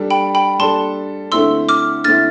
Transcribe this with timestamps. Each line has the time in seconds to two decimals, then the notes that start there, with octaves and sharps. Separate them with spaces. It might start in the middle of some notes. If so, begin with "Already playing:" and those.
Already playing: G3 D4 A4
0.10 G5 B5
0.35 G5 B5
0.59 G3 D4 A4 A5 C6
1.32 D3 A3 C4 E4 C6 E6
1.69 D6 F6
2.04 D3 A3 C4 E4 F6 A6